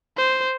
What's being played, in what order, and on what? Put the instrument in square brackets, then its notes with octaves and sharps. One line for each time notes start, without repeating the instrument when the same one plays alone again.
[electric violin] C5